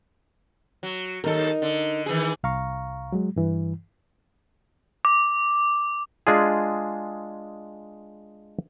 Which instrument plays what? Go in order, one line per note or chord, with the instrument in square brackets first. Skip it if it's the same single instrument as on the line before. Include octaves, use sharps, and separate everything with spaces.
[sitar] F#3
[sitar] D#2 A4 [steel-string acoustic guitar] D#4 A#4
[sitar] D3
D#3 E3 G#4
[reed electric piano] C2 F5 A#5 C#6
F#3 G#3
G2 E3
[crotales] D6
[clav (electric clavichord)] G#3 D4 F4 G#4